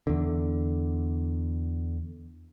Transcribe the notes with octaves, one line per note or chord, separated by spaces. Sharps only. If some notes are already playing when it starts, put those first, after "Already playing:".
E2 D3